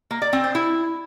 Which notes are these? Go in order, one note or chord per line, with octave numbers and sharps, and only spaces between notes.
A#3
D5
C4
C5
E4